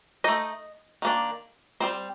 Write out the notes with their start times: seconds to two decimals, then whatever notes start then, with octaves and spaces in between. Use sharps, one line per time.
0.24 A3 D#4 D#5
1.02 D#3 A#3 D4
1.80 G3 C4 D#4 C5